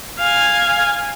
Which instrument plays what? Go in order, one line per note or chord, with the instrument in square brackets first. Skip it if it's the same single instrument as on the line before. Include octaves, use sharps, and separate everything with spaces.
[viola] F5 G#5